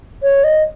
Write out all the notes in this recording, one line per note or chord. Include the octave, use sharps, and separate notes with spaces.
C#5
D#5